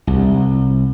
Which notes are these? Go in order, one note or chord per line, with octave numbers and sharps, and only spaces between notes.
C2